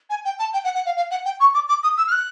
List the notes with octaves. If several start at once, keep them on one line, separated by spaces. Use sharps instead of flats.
G#5
G5
A5
G5
F#5
F#5
F5
F5
F#5
G5
C#6
D6
D6
D#6
E6
F6
F#6